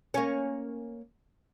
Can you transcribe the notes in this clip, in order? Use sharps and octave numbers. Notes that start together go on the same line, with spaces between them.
A#3 C#4